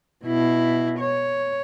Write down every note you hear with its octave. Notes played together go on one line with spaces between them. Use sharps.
B2 E4
C#5